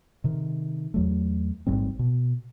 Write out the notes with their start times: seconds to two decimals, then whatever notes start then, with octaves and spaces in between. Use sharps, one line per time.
0.24 C3 D#3
0.94 E2 F#3 A3
1.67 A1 G#2 G3 C4
1.99 B2